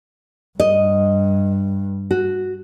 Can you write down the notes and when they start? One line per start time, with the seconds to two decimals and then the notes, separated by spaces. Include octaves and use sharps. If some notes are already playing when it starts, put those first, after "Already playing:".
0.60 G2 D#5
2.11 F#4